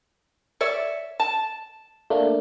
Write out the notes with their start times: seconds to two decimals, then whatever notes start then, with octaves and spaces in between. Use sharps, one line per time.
0.61 C#5 D5 E5
1.20 A5
2.10 A3 A#3 D4